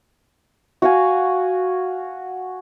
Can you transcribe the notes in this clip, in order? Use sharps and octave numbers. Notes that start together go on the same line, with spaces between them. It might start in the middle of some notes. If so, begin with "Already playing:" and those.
F#4 F5 G#5